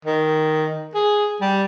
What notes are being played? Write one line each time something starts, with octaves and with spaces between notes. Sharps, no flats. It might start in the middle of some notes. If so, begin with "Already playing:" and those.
D#3
G#4
G3